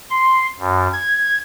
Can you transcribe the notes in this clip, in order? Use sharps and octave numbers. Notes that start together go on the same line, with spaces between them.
C6
F#2
G#6